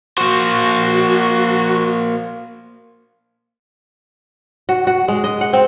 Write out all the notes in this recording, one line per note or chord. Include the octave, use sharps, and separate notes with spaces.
A#3 F#4 C5
F#4
F#4
G#3
D#5
F#5
C4